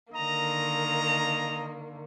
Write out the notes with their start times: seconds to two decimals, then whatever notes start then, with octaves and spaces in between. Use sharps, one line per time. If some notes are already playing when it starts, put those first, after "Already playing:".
0.13 D3 D#3 A#3 D#5 A#5